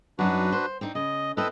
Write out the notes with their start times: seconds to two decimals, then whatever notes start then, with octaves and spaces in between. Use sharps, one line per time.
0.19 F#2 F#3 D4 D#4 F#4 B4
0.52 C5
0.81 C4 D4 D#4
0.95 C#3 D#5
1.37 C4 E4 A4 B4 D#5